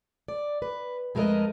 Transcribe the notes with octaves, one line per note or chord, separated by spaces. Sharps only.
D5
B4
F2 G#3 A3 A#4 B4 D#5